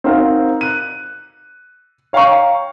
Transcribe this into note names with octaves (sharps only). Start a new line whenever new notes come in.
C4 D#4 F#4 A#4 C5 F5
F#6 D#7
C#5 F5 G5 A#5 C#6